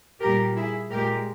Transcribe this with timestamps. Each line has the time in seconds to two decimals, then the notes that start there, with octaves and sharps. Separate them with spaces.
0.21 A#2 G3 G4 A#4
0.55 E4 G#4
0.90 A#2 G#3 G4 A#4